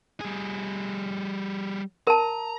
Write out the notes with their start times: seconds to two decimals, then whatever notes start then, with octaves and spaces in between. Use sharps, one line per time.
0.21 G3 G#4
2.07 A#4 A5 A#5